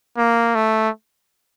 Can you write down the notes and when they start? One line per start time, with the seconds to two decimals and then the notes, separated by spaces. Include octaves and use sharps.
0.18 A#3
0.55 A3